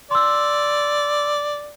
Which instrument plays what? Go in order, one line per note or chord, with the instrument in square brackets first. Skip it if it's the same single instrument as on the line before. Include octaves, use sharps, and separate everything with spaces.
[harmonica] D5 [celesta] C6 E6